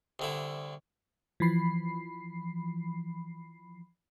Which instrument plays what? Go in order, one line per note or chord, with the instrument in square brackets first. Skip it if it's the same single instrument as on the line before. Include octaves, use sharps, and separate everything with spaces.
[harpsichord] C2 D3 E4
[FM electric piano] E3 F3 B5 C7